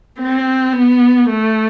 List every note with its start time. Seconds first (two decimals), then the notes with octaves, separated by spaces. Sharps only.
0.19 C4
0.73 B3
1.29 A3